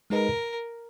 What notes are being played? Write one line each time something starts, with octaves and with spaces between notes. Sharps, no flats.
G#3 D#4 G#4 A#4 B4 D#5